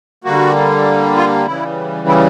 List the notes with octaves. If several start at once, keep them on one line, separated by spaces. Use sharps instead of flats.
D3 G3 A#3 F#4
F4
C#3 E3 G3 E4
E4